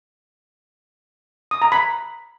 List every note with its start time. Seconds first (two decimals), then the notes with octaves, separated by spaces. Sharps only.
1.51 D#6
1.62 A#5
1.72 B5